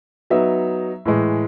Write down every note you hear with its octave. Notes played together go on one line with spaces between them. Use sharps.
F#3 B3 D#4 E5
A2 E3 G#3